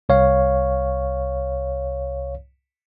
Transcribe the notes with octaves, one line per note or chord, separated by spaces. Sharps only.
C2 C#5 F5